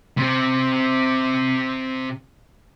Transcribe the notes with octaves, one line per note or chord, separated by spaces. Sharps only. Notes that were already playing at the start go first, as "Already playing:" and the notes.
C3 C4